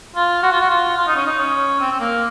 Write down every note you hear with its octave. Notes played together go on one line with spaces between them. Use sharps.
F4
F#4
F4
F#4
F4
F4
D#4
C#4
D#4
C#4
C4
C4
A#3